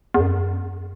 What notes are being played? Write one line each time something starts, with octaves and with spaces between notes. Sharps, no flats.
E2
F#2